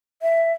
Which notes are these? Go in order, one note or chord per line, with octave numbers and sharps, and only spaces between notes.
E5